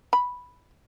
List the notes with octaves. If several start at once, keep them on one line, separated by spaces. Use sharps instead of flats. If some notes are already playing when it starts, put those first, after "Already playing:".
B5